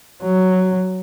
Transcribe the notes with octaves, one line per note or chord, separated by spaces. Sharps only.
F#3